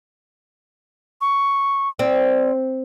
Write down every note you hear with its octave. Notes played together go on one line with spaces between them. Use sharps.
C#6
C4 D5